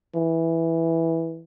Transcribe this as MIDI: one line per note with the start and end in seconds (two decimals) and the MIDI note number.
0.15 1.43 52